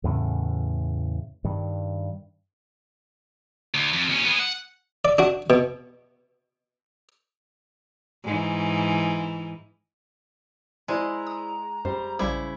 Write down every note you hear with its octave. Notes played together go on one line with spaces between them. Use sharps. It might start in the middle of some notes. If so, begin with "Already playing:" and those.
E2 A2 C#3
G2 D#3
D2
F2
D#2 C#4
B3 G#4
F#5
D5
D4 F#4
B2
G#2 E3
G#3 E4 C5 D5 A#5
D#6
F#2 G3 C5
A#1 C#3 G3 E4 C5 D6